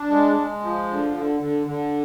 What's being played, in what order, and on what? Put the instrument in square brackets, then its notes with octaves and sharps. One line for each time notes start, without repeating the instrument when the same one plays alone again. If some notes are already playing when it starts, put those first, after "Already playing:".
Already playing: [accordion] D4
G#3
G#3
F3
D3
D3
D3
D3